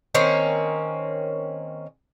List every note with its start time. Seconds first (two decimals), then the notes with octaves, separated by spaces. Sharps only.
0.15 D#3 A#3 C4 C#4